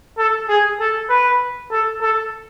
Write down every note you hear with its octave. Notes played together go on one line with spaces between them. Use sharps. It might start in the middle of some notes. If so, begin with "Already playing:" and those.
A4
G#4
A4
B4
A4
A4